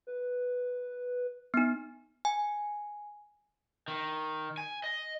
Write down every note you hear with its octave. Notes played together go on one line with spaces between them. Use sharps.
B4
B3 D#4
G#5
D#3
G#5
D#5